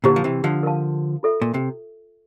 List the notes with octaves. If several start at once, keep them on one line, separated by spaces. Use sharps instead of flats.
A#2 D3 E4 G4 C5
F3
C3 E3
D3 F3
A#4 F5 A5
F4 A4 E5
A#2
C3